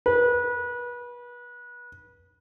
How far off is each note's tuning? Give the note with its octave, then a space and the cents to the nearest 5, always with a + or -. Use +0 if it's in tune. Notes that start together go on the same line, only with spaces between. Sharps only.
B4 -30